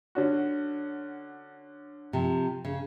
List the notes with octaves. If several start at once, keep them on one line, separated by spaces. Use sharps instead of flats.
D3 C#4 F#4
C3 F3
C#3